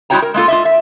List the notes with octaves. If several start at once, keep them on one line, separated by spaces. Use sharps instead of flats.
G#3 E4 F#4 C#5 G5 A#5
A#4
G#3 A#3 F4 A4
F4 D#5 E5
E5